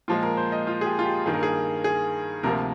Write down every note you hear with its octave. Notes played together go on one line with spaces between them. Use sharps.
A#2 F3 G#3 F4
A#4
C5
D#5
F4
G#4
G4
F4
G4
G2 D#3 A#3 G#4
A#4
G#4
G#4
D2 C3 F3 A#3 A#4